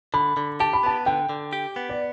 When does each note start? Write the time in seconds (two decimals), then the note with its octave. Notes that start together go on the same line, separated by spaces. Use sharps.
0.14 D3 B5
0.37 D3
0.60 G4 A5
0.73 B5
0.83 B3 A5
1.06 D3 G5
1.29 D3
1.53 G4
1.76 B3
1.89 D5